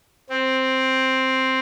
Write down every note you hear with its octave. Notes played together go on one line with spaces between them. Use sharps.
C4